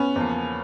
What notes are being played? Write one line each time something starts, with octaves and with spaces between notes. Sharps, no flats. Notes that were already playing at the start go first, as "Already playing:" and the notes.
Already playing: B3 C#4
E2 C#3 F3 A#3